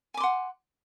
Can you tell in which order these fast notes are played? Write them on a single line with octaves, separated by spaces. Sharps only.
G#5 D6 C6 F#5